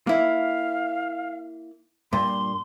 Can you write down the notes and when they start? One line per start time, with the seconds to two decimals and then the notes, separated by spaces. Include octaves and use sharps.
0.07 A#3 E4 F5
2.13 G2 A#2 C6